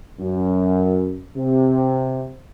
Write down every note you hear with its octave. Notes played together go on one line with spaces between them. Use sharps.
F#2
C3